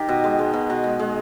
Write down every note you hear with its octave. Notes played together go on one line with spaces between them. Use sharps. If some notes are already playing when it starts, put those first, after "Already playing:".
Already playing: D#3 D#4 G4
B2
G#3
G#3
B2
B2
G#3
G#3